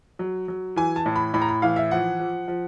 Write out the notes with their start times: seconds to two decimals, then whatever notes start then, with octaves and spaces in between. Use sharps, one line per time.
0.19 F#3
0.48 F#3
0.76 E3 G#5
0.96 A5
1.06 A2
1.16 B5
1.34 A2 B5
1.42 A#5
1.49 B5
1.62 E3 F5
1.76 E5
1.91 F3 F#5
2.20 F3
2.48 F3